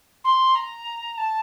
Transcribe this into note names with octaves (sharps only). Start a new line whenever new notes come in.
C6
A#5
A5